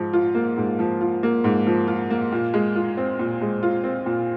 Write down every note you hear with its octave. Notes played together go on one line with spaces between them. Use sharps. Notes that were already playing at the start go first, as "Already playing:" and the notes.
Already playing: G#2 F3
F4
A#3
G#2
F3
F4
A#3
G#2
F3
F4
A#3
A#2
G#3
F4
C4
A#2
G#3
F4
C4
A#2